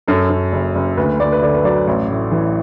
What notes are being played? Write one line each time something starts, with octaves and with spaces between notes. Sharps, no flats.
F#2 A4
F#2
F#1
F#1
D2 B4
D2 D5
B4
D3 D5
B4
F#3 D5
A1
A2
E3